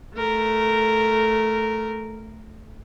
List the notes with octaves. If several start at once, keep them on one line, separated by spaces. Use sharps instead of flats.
A3 A#4